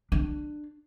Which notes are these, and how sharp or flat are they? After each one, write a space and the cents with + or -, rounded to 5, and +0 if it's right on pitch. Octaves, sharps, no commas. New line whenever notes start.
D4 +20